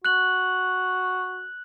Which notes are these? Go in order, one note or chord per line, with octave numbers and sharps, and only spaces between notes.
F#4 F#6 F#7